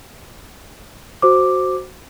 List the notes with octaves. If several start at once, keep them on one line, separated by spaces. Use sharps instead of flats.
F#4 C5 D6